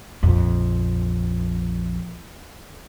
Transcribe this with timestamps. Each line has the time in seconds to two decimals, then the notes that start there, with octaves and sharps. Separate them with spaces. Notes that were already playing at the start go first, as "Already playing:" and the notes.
0.23 A#1 F2